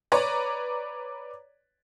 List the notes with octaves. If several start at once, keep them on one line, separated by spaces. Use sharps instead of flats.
B4 C#5 D5 A#5